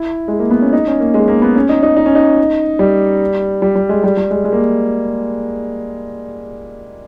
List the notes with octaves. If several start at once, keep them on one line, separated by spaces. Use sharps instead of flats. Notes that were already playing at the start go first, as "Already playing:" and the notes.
Already playing: E4
G#3
A#3
B3
C#4
D#4
C#4
A#3
G#3
A#3
B3
C#4
D#4
D#4
D#4
C#4
D#4
G3
G3
G3
G#3
G3
G3
G#3
G#3
A#3